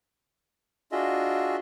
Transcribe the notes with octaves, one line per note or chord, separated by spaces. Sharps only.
D4 F4 F#4 G#4 D#5 E5